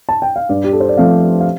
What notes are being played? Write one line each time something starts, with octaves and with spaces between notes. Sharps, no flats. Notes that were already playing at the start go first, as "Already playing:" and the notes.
A5
G5
F5
G2 D5
G4
A4
C5
D5
F3 A3 C4 F5
F5